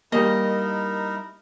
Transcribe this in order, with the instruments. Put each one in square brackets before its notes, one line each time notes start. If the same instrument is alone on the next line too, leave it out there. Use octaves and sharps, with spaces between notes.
[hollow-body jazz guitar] G3 A#3 [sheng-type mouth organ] D#4 E4 A#4 [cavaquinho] D#5